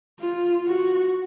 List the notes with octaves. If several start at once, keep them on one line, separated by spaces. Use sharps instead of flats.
F4
F#4